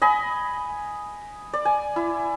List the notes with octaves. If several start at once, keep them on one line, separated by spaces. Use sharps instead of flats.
D#5 G#5 B5
D5
G#5
E4